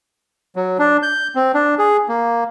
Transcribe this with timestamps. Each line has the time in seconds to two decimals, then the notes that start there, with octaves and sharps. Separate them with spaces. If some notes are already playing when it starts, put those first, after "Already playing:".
0.56 F#3
0.79 D4
1.03 G6
1.35 C4
1.54 D4
1.78 G#4
2.09 A#3